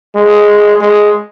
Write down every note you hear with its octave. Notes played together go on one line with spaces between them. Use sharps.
G#3
G#3